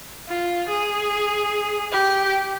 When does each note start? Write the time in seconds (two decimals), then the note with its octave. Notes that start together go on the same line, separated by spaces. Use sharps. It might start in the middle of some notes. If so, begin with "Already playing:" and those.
0.28 F4
0.69 G#4
1.92 G4